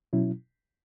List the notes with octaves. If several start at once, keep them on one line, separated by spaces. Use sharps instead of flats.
B2 F#3 C#4 E4